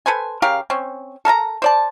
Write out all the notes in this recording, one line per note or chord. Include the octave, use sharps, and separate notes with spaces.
A4 B4 C5 G#5
C#3 G4 A#4 F5
C4 C#4
A4 A#4 A5 A#5
C5 D5 A5